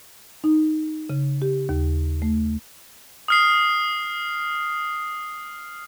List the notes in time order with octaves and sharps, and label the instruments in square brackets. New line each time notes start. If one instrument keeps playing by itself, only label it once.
[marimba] D#4
C#3
G4
D#2
A3
[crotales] D#6 F6 C7